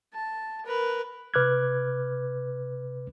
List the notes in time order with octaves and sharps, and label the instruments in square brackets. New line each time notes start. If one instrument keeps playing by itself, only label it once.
[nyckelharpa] A5
A#4 B4
[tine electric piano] C3 B4 D6 F6 F#6 G#6